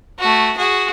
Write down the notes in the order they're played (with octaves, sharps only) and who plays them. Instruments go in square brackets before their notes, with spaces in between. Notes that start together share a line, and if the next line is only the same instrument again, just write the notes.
[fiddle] A3 F#4
F#4 G#4